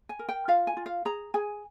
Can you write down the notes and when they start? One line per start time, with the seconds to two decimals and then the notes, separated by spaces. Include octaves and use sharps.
0.09 G#5
0.19 A#4
0.29 G5
0.48 F4 F5
0.67 G#5
0.77 F4
0.86 F5
1.05 G#4 A#5
1.34 G#4 G#5